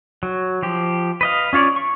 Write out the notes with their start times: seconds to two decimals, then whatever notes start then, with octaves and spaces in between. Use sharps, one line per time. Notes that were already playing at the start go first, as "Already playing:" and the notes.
0.23 F#3
0.63 F3 G4
1.21 B4 D#5 F5
1.53 C#4 F4 C#5 D5
1.76 C#6